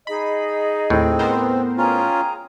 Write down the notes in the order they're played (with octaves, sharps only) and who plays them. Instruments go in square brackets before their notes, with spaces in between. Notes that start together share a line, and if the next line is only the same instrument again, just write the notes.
[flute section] D#4 G#4 D#5 [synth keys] B5
[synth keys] D#2 [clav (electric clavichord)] A2 [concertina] C4
[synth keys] B3 A#4 C5
[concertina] C#4 F4 [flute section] G#4 G5 A#5